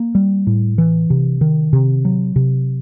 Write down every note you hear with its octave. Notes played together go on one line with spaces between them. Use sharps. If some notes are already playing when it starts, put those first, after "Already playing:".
Already playing: A#3
G3
A2
E3
C3
D#3
C3
F#3
C3